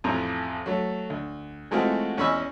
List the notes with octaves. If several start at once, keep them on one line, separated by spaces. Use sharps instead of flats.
A1 F2 A#5
F#3 A3
D2
E3 G#3 A3 C4 F4 F#4
E2 C#4 D#5 B5 C#6 E6